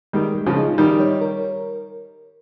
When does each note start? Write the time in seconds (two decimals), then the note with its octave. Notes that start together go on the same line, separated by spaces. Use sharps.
0.13 D#3 G3 G#3
0.35 G#3
0.46 C#3 F3
0.57 D#4
0.78 D#3 G3 D#4
1.00 C#5
1.21 A#4